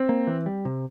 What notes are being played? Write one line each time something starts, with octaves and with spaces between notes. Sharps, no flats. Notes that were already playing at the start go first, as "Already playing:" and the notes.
Already playing: C4
A#3
E3
G3
C3